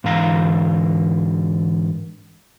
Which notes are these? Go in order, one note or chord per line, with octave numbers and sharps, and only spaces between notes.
G#2 D3 E3 F5 A#5